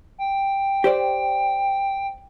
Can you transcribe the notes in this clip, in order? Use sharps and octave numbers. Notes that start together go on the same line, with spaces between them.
G5
G4 C5 D5